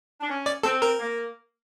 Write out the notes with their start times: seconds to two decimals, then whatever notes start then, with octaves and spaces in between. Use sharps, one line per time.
0.21 D4
0.28 C#4
0.46 D5
0.63 C4 A4
0.82 A#4
0.99 A#3